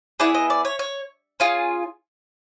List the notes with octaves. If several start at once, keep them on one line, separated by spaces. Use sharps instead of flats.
B3 E4 G#4 D5
D#5
D5
C#5
C#5
C#4 F4 G#4